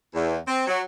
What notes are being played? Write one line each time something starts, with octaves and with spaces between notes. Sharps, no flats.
E2
C4
F#3